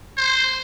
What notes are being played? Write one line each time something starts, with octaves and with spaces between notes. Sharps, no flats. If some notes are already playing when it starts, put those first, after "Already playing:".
C5